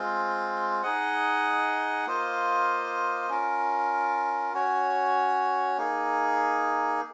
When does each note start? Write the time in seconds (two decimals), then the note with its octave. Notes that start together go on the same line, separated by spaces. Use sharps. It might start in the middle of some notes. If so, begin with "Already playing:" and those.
Already playing: G#3 C4 F4
0.83 D#4 G#4 D#5 F#5
2.06 A#3 F4 C5 D#5
3.29 C#4 F4 A#4
4.54 C#4 F#4 C#5
5.77 A#3 D#4 G#4